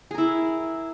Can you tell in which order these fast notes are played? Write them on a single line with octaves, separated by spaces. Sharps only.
G#4 A#4 E4